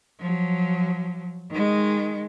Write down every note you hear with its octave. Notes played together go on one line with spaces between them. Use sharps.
F3 F#3
D#3 G#3